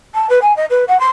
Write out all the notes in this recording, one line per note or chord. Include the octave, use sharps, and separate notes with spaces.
A5
B4
G#5
D#5
B4
F#5
C6